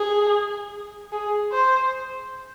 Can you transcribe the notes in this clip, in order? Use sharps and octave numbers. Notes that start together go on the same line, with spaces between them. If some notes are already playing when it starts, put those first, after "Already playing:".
Already playing: G#4
G#4
C5